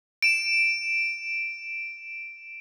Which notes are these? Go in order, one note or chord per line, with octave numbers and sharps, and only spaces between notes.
D7 E7